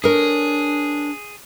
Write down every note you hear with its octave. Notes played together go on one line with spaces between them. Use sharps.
D4 G#4 A#4 C#5